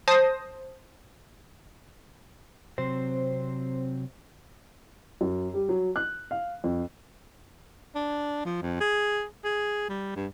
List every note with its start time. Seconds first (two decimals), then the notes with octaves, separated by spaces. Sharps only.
0.08 C5 A5 D#6 A#6
2.78 C3 F#3 C4 C5
5.21 F#2
5.54 G3
5.69 F#3
5.96 F#6
6.31 F5
6.64 F2
7.95 D4
8.45 F3
8.62 F2
8.80 G#4
9.45 G#4
9.89 G3
10.16 G2